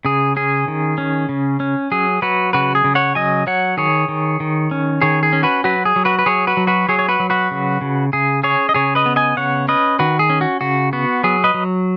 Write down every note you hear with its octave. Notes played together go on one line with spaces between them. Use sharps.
C#3 G#4
C#4 G#4
D#3
C#4
C#3
C#4
F#3 G#4
F#3 F#4 B4
C#3 F#4 B4
G#4
C#3
C#5 F#5
F#3 D#5 G#5
F#3 C#5 F#5
D#3 G#4 C#5
D#3
D#3
C#4
D#3 G#4 C#5
G#4
C#4
F#4 B4
F#3 F#4 B4
G#4
F#3
F#4 B4
B4
F#3 G#4 C#5
F#4 B4
F#3
F#4 B4
F#3 G#4 C#5
C#5
F#4 B4
F#3
F#4 B4
C#3
C#3
C#3 G#4
C#4 G#4 C#5
D#5
C#3 G#4 C#5
B4 D#5
B3
D#5 G#5
C#3 C#5 F#5
C#4 B4 D#5
D#3 F#4 B4
G#4
C#4
F#4
C#3 F#4
B3 F#4
F#3 G#4
B4 D#5
F#3